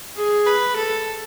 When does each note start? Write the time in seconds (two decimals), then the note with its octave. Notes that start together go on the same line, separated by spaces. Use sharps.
0.16 G#4
0.47 B4
0.77 A4